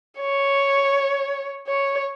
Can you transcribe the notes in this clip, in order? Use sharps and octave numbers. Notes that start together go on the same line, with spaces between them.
C#5
C#5